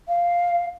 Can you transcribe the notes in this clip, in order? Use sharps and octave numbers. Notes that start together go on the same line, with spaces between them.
F5